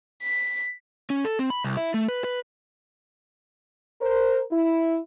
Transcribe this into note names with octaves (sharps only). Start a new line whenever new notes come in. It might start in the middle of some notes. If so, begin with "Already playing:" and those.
B6
C#4
A4
C4
B5
C2
E4
A3
B4
B4
A#4 C5
E4